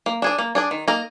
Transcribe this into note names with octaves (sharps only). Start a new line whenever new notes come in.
A#3
D4 G#4 D5
A#3
D4 G#4 D5
D#3
A#3 D#4 A#4